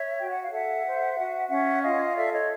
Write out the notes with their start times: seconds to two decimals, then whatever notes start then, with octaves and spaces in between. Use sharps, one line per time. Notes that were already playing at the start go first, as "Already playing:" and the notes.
Already playing: C#5 E5
0.18 F#4 G5
0.30 F#5
0.42 F5
0.51 A4 E5 F#5
0.84 C5
1.18 F#4
1.49 C#4 E5 F#5
1.83 F4 D#5 F5
2.09 F5
2.16 A4 D5 E5
2.32 C#5 D#5